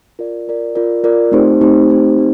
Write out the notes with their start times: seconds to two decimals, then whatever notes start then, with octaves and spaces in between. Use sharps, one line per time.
0.19 F4 A#4 D5
0.48 F4 A#4 D5
0.75 F4 A#4 D5
1.04 F4 A#4 D5
1.32 A3 C4 D#4 G4 C5
1.61 A3 C4 D#4 G4 C5
1.89 A3 C4 D#4 G4 C5
2.18 A3 C4 D#4